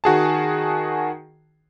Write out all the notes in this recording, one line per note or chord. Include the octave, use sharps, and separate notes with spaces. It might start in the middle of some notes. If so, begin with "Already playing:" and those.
D#3 F#4 G#4 A5